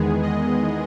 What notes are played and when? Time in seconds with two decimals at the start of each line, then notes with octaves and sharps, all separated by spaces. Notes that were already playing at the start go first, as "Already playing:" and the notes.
Already playing: E2 D#3 G#3 B3 G#4
0.22 D#5